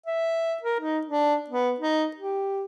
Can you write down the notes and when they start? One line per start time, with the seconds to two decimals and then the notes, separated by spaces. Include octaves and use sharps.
0.06 E5
0.62 A#4
0.80 D#4
1.06 D4
1.50 B3
1.80 D#4
2.16 G4